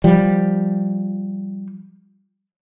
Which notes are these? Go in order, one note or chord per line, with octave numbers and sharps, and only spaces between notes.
F3 G3